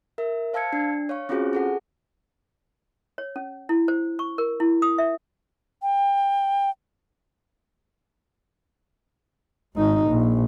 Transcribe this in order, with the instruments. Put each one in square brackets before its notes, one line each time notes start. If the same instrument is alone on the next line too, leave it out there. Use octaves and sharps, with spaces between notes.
[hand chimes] A#4 E5
C5 F5 A5 E6 G#6 C#7
D4
C#5 F5 C#6
C4 C#4 F4 F#4 G#4 C5
G#4 A4 F#5
[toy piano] C#5
C#4
E4
C5
C#6
A#4
E4
D#6
E5
[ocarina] G5
[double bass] G#1 D#4
A#1